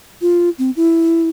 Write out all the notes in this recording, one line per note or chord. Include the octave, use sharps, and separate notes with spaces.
F4
C4
E4